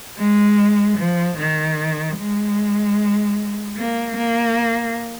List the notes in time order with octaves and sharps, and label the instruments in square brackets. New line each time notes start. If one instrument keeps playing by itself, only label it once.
[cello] G#3
F3
D#3
G#3
A#3
A#3